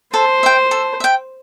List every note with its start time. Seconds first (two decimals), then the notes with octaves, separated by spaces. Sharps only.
0.14 A4 C5
0.43 E5 G5
0.71 A4
1.00 E5 G5